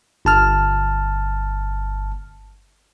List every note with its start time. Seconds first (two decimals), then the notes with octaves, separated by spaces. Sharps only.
0.25 G1 A5 F6